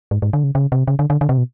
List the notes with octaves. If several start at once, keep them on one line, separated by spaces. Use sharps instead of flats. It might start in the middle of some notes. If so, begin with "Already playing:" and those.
G#2
G#2
D3
C#3
C#3
C3
C#3
D3
D3
D3
C3
B2